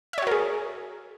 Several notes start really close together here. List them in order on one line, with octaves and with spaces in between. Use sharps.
E5 C#5 F#4 A#4 G#4